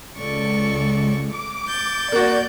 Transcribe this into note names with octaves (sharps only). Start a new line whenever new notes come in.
C#2 A4 D5 C#6
D6
G6 A6
A#3 F#4 D5